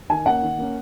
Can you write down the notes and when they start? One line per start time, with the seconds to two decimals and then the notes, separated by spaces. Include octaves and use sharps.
0.10 D#3 G#5
0.26 A#3 C#4 F#5
0.42 D#3
0.58 A#3 C#4